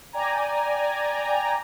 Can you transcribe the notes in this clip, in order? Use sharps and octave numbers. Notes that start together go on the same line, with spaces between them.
D5 G5 G#5 A#5